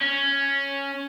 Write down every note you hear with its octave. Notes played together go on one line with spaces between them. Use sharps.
C#4